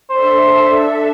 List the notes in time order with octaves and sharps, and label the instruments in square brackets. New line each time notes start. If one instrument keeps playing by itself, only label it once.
[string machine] D4 A4 E5 [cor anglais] C5